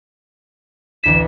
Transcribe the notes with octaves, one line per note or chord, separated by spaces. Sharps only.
A1 D2 B6 E7